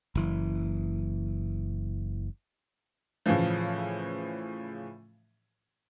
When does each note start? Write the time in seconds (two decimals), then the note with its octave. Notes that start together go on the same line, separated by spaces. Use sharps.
0.15 F#1 E3
3.26 A2 C#3 E3 F3